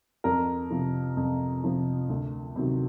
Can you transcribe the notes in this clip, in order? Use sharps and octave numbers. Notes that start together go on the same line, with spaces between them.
F2 A#4
C3 F3
F2
C3 F3
D2
C3 D#3 F#3